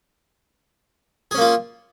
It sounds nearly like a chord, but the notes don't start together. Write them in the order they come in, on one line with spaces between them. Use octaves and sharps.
G#4 C#4 A#3 F4